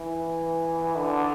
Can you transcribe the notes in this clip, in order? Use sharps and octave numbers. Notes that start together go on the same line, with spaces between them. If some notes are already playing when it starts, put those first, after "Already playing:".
Already playing: E3
D3